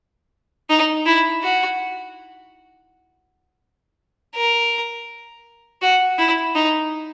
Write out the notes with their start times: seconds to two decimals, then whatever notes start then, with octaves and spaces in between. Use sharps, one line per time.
0.70 D#4
1.06 E4
1.43 F#4
4.36 A#4
5.82 F#4
6.18 E4
6.55 D#4